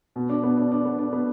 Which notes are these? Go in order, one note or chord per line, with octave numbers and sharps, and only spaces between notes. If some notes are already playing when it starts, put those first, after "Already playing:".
B2
D4
B3
D4
D4
B3
D4
B3